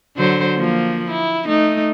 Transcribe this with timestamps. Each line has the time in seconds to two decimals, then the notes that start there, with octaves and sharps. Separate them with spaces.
0.17 D3 F#3 C5
0.57 F3 A#3
1.10 E4
1.45 A3 D#4